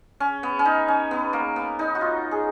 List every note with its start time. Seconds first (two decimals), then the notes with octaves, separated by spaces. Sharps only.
0.20 C#4
0.43 B3
0.59 C#4
0.65 D#4
0.88 C#4
1.11 B3
1.33 A#3
1.56 B3
1.79 D#4
1.95 F#4
2.01 F4
2.31 G#4